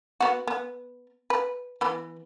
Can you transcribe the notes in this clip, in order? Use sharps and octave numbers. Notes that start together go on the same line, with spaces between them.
B3 F#4
B3
B4
E3 B3 B5